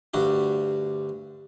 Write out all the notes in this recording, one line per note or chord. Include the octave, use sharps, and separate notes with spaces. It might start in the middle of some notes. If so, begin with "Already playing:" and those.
D2 G2 F#4 G4